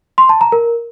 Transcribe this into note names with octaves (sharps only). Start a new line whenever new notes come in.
C6
A5
A#5
A#4